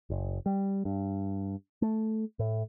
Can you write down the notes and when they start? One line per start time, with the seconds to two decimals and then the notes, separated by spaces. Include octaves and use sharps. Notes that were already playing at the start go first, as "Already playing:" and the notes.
0.10 F#1
0.46 G3
0.85 G2
1.82 A3
2.39 A2